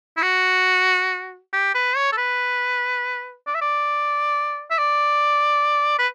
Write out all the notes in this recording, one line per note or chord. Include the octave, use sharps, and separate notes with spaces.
E4
F#4
G4
B4
C#5
A4
B4
D5
E5
D5
E5
D5
B4